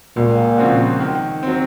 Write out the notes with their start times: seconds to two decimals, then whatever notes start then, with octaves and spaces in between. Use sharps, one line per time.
0.16 C#2 A#2
0.58 C#3 F3 C4 F#4
1.00 D#3
1.43 F#3 C4